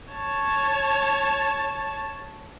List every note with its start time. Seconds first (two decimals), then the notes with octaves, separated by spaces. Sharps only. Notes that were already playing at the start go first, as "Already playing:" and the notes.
0.13 C#5 A5